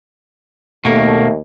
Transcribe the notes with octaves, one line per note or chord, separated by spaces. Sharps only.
D#2 B2 A3 A#3